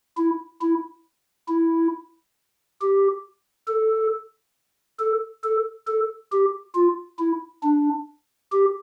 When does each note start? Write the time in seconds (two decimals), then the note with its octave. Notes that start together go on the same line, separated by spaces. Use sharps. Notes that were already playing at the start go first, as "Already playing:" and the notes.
0.17 E4
0.61 E4
1.48 E4
2.81 G4
3.68 A4
5.00 A4
5.44 A4
5.87 A4
6.32 G4
6.75 F4
7.19 E4
7.63 D4
8.52 G4